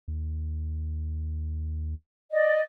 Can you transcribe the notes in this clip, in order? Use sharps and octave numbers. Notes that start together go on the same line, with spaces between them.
D#2
D5 D#5